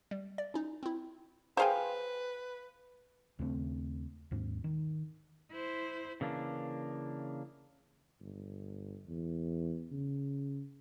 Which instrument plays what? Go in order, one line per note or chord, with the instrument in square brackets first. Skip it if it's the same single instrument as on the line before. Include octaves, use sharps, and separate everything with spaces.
[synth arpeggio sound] G3
D5
C#4 D#4
C4 E4
[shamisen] F3 G#4 G#5 [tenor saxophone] B4 [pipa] C5 F5 G5
[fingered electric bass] D#2 C#3 A3 C4
D#2 G#2
D#3
[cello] E4 C5
[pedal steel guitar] C#3 E3 A#3 D4
[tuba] G1
E2
C#3